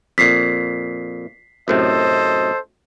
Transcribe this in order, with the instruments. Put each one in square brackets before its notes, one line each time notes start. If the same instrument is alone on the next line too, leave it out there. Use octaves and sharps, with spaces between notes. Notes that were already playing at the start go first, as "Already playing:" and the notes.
[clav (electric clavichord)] F2 A#2 [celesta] B6 C7
[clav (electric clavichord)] F#2 A2 C3 [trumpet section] A4 C5 D#5